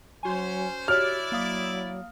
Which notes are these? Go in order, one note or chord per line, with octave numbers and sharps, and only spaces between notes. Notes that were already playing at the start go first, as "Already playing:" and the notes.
F#3 C#4 F#4 C5 G#5
E4 F#4 G4 C#5 D5 F6
F#3 A#3 F5 D#6